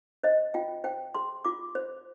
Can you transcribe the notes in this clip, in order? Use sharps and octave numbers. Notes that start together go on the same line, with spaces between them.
C5 D#5
F4 G5
C5 G5
G#4 C6
F4 D6
C5